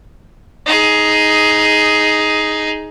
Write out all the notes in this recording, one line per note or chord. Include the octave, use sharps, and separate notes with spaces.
D#4 G#4